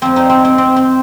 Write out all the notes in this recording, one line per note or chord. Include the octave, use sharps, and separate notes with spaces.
F2 F3 C4
D#4
C4
C4
C4
C4